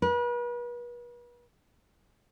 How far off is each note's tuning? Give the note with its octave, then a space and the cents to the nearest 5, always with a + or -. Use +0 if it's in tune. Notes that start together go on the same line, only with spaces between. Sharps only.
B4 -40